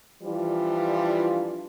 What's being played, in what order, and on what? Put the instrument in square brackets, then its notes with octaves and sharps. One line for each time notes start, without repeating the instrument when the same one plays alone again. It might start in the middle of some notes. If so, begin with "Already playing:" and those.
[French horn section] E3 F3 G3 D4 F4